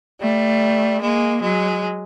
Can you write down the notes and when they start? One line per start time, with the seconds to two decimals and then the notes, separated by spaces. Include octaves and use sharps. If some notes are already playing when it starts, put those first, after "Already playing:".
0.20 G3 A3
1.01 G#3 A#3
1.42 F#3 G#3